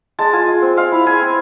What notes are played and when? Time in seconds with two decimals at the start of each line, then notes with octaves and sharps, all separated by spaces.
0.19 G#3 A5
0.33 F4 G#5
0.48 G#3
0.62 C4
0.77 G#3 F5
0.92 E4
1.06 G#3 G#5
1.21 C4